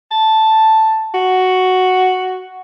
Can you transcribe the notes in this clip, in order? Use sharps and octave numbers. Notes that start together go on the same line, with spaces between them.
A5
F#4